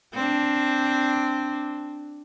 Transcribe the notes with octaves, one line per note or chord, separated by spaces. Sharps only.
C4 D4